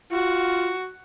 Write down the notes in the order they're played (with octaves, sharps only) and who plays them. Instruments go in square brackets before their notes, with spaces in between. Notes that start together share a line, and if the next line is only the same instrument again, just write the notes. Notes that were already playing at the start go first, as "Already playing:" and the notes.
[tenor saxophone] F4 [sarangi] F#4